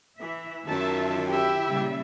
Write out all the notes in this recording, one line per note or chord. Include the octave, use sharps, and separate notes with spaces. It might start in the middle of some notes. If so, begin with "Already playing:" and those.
E3 E5
F#2 D#3 F4 E5 A5
E4 G4 E5
A#2 C#3 G3